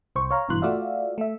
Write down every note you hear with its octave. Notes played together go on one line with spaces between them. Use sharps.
C2 C5 C#6
C#5 F5 A#5
G#1 G2 B2 E3 C6 F#6
A3 F4 F#4 D5 E5 F5
A3 E5